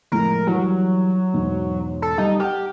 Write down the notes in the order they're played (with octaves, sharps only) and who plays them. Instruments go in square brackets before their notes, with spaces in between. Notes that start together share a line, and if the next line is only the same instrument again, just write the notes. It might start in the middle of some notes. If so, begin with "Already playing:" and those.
[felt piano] F2 A2 G#3 [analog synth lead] A#4
[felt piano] E3 G3 [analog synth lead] F#3
[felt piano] E1 G#2
[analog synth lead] A4
[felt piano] G3 [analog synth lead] D#4
[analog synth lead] G4 [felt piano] F#5 F6